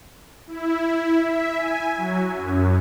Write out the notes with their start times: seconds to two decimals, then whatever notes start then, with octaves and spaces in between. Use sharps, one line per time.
0.47 E4
1.19 E5
1.55 G#5
1.97 F#3
2.31 F#2